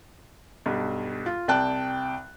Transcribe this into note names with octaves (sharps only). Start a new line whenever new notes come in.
B1 G2
F4
C2 D5 G5 A5 F#6